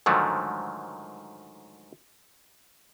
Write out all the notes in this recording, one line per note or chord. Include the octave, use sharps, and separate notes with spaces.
G#2 D3 D#3 F3 F#3 A3